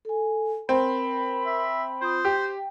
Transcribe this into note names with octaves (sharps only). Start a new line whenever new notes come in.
A4 G#5
C4 A#4 B5
E5
F4 C5 D#6
G4 G5